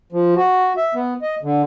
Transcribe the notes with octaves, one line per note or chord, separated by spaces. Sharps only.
F3
F#4
E5
B3
D#5
D3